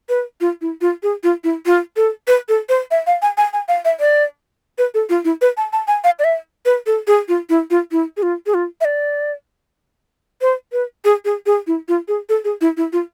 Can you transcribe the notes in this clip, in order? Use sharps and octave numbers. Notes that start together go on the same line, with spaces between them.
B4
F4
E4
F4
G#4
F4
E4
F4
A4
B4
A4
C5
E5
F5
G#5
G#5
G#5
F5
E5
D5
B4
A4
F4
E4
B4
A5
A5
G#5
F5
D5
E5
B4
A4
G#4
F4
E4
F4
E4
G#4
F4
G#4
F4
E5
D5
C5
B4
G#4
G#4
G#4
E4
F4
G#4
A4
G#4
E4
E4
F4